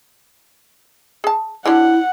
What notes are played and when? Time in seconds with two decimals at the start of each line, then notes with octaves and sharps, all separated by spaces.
1.24 G#4 A5
1.66 D3 F#3 D4 E4 F#5